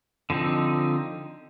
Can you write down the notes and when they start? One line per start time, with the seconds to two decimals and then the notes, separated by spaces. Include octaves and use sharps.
0.30 D3 F3 C4 D#4